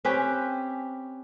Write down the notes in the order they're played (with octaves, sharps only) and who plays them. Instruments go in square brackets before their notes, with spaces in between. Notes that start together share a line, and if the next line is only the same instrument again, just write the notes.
[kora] C4 C#4 G4 B4